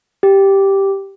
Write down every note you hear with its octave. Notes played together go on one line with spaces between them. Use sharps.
G4